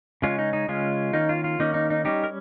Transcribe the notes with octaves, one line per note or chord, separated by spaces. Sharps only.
C#3 G#3 C#4 F4
D#4
D#4
C#3 G#3 C#4 F4
D#3 A#3 C#4 D#4
F4
F4
D#3 A#3 C#4 D#4
D#4
D#4
G3 C#4 D#4 G4
A#4